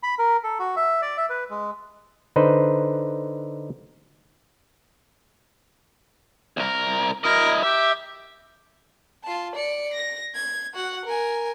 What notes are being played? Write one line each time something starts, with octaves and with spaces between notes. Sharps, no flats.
B5
A#4
A4
F#4
E5
D5
E5
B4
G#3
D3 D#4 B4 C5
C2 A#4
E4 A#4 D#5
G4 E5
F4 A5
D5 C#7
A#6
G#6
F#4 F#5
A#4 G#5